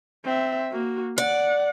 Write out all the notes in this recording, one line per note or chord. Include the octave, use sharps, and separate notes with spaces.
C4 E5
A#3 F#4
D5 F#5